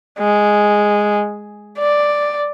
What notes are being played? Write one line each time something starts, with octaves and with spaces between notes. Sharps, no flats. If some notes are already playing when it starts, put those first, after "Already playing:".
G#3
D5